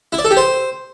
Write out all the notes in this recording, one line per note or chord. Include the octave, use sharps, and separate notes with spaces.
E4
D5
A4
G4
C5